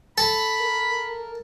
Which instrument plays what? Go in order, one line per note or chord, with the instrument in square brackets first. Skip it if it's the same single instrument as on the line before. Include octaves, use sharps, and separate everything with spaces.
[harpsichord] A4 [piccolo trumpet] B5
[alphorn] A#4